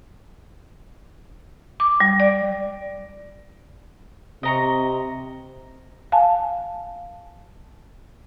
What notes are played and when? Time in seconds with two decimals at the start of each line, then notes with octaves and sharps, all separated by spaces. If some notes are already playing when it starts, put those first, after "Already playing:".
1.80 D6
2.00 G3
2.20 D5
4.43 C3 D#5 A#5 C#6
6.12 F5 G#5 A5